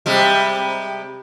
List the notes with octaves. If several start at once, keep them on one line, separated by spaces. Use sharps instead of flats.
C3 G3 G#3